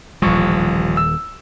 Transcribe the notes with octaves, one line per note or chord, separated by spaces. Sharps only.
D#1 A1 F3 G3 C#6
E6